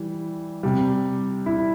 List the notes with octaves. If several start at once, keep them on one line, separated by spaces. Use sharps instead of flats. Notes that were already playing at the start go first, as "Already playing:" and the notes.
Already playing: E3 G3
C3 G3
E4